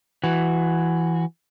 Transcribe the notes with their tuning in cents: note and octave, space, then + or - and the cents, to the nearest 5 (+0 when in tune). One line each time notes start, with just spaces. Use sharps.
E3 +15 F#4 +0